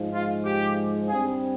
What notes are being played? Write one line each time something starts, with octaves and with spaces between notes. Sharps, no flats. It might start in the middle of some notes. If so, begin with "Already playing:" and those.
Already playing: G#2 F3 G#3
F4
G4
G2 G3 C4 G#4